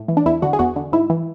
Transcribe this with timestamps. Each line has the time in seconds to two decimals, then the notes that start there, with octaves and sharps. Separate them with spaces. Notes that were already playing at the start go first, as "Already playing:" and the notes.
Already playing: A2
0.08 E3
0.17 D4
0.26 E2 E4
0.42 D3 F#4
0.53 G#4
0.59 E2 F#4
0.76 D3
0.92 G#2 E4
1.10 E3